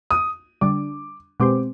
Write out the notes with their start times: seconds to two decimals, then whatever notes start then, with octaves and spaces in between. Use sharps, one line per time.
0.11 D#6
0.61 D3 G3 D4 D6
1.40 B2 G#3 C4 G4 C5 D6